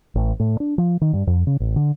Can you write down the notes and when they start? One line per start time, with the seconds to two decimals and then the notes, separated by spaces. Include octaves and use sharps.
0.15 A1
0.40 A2
0.60 D4
0.78 F3
1.01 D#3
1.13 G2
1.27 F2
1.47 C#3
1.60 A1
1.76 D3